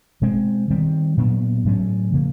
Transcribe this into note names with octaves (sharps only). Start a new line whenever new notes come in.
B2 G#3 C4
D#3 G3 C4
A#2 F#3 B3 D4
A2 F#3 A3 C#4
C#3 F3 A#3